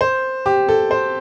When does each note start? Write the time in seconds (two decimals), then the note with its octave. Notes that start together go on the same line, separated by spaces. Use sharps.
0.01 C5
0.46 G4
0.69 A4
0.91 C5